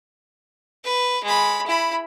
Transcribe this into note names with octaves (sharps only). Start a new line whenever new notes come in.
B4
G#3 B5
E4 B5